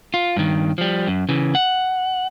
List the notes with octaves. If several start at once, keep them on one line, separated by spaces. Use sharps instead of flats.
F4
G2 D#3
F3 G3
F#2
C#3 E3
F#5